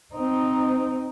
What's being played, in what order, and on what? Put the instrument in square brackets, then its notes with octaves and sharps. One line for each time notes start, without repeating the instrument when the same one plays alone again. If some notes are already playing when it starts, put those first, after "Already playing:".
[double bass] C4 D#4